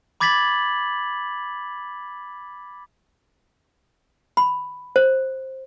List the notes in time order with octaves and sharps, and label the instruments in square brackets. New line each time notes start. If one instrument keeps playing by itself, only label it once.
[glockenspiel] B5 D6 G#6 A6 B6 F#7
[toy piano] B5
C5